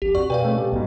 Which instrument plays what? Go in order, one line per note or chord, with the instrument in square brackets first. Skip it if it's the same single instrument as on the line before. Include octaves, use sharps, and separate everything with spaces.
[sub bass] A#1 [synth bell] G4
[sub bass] F2 [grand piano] F#4 [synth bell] D5 C#6
[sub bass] B2 [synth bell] B4 D5 F5 [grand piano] G5
[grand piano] G#3 A3 C#4
G4 A4
[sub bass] B1 [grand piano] G#2 B2